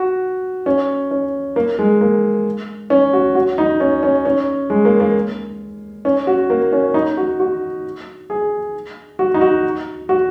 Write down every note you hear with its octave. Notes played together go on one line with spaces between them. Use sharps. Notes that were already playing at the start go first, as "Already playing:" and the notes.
Already playing: F#4
C#4
C#4
A#3
G#3
A#3
C#4
F#4
F#4
D#4
C#4
C#4
C#4
G#3
A#3
A#3
C#4
F#4
A#3
C#4
D#4
F#4
F#4
G#4
F#4
D#4
F#4
F#4